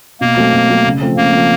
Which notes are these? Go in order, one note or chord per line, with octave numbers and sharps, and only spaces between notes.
B2 A#3
F#3 A3 C4
B2
F#3 A3 C4
C#3
F3 A3 C4
C#3 A#3
F3 A3 C4